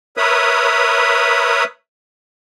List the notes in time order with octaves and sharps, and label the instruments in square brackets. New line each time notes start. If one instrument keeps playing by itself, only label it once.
[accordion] A#4 B4 C#5 E5 B5 D#6